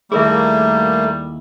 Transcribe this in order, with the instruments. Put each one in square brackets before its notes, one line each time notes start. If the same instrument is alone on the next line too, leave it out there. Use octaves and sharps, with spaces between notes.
[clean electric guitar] D#2 E4 [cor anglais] G3 [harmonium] A3 A#3 [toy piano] G#4 A#4 E5